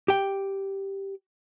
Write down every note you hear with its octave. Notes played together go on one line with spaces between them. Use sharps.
G4 G5